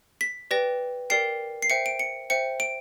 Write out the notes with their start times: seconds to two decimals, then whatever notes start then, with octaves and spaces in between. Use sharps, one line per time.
0.21 B6
0.51 G4 B4 D5 G5 A#6
1.10 G4 A#4 D5 G5 C7
1.62 C7
1.70 C5 E5 G5 C#7
1.86 D7
1.99 C#7
2.30 C5 E5 G5 C#7
2.60 D7